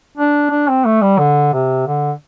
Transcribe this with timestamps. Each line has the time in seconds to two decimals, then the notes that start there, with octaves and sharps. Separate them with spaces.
0.17 D4
0.51 D4
0.68 C4
0.85 A3
1.02 G3
1.19 D3
1.53 C3
1.87 D3